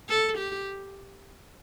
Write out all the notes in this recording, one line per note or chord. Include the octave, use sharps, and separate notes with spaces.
A4
G4